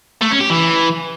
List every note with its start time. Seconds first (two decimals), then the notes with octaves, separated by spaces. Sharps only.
0.22 A3
0.31 C#4
0.41 G4
0.50 E3